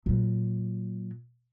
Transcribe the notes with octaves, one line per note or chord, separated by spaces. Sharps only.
A#2 F#3